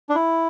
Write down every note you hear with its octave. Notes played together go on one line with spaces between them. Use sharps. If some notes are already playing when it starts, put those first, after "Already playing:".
D4
E4